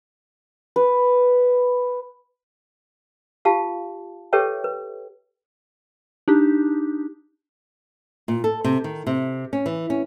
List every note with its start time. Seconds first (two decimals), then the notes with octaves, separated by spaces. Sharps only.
0.76 B4
3.45 F4 G4 F5 A5
4.33 G4 A4 B4 C#5 E5 G5
4.64 B4
6.28 D4 D#4 G4
8.28 A#2
8.44 A4
8.64 C3
8.84 D#3
9.07 C3
9.53 C#4
9.66 E3
9.90 C#4